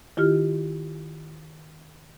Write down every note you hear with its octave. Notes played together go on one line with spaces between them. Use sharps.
D#3 E4 F4 G4 F6